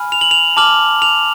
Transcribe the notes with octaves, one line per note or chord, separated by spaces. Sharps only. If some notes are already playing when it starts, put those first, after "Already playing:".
Already playing: G#5 B5 F6
F7
F#7
F7
A5 D6 F6 F#7
F7